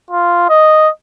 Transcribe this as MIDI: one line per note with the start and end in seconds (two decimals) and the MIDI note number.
0.11 0.48 65
0.49 0.89 75